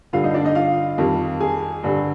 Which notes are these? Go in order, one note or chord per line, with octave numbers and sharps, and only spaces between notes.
G2 D3 G3 F4 F5
D#4 D#5
D4 D5
D#4 D#5
F4 F5
F2 D#3 G3
G#4 G#5
G2 D3 G3